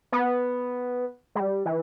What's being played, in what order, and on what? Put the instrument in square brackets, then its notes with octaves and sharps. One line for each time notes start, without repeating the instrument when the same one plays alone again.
[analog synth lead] B3
G#3
G3
E3